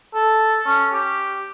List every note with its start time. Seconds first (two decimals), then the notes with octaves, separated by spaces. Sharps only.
0.14 A4
0.66 C#4
0.93 G4